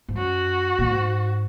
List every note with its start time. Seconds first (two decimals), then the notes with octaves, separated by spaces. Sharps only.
0.09 G#2
0.17 F#2 F#4
0.79 A#2
0.90 G#2